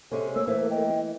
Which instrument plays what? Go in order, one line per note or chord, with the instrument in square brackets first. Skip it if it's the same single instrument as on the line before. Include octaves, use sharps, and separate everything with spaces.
[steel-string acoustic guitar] C3 G#3 C#4 [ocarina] A4
[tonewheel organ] A3 A#3 [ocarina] C#5 [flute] E6
[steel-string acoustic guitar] E3 [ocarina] C5 [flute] E5
[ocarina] D#5 [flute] G5